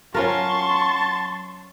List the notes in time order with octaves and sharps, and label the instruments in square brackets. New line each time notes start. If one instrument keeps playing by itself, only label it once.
[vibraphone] F#3 [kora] C#4 F4 A#4 [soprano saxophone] A5 [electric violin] C6 C#6